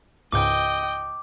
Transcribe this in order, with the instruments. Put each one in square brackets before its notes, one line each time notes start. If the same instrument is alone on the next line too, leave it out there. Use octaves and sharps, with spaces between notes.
[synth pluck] C#2 G#2 G6 [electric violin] D#5 G5 [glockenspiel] D6